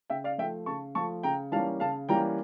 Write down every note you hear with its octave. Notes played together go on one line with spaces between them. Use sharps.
C#3 E5 G5
D5 F5
F3 A3 E5 G5
C#3 A5 C#6
F3 A3 A5 C#6
C#3 G5 A#5
E3 G3 A#3 C#4 F5 A5
C#3 F5 A5
E3 G3 A#3 C#4 G5 A#5